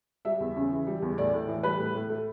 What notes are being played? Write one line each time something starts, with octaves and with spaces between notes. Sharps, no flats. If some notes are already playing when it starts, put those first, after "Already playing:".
G3 E5
E2
C#3
E3
G3
E2
A2 D5
A2
E3
G3 B4
A2
A2
A3